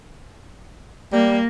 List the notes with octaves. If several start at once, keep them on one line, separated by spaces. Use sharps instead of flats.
G3 A#3